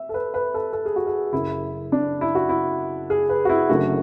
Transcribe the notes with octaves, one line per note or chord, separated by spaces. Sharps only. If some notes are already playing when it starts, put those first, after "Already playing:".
Already playing: E5
A4
B4
B4
A4
A4
G#4
F#4
G#4
F#1 F#2 C#3 E4
D4
E4
F#4
E4
G#4
B4
F#4
E4
F#1 F#2 D3 A3 F#4